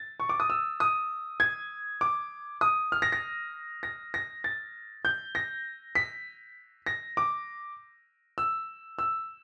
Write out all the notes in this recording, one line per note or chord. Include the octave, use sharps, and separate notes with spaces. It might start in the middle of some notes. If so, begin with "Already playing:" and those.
Already playing: A6
C#6
D6
D#6
E6
D#6
G#6
D6
D#6
F6
A#6
A#6
A#6
A#6
A6
G6
A#6
B6
A#6
D6
E6
E6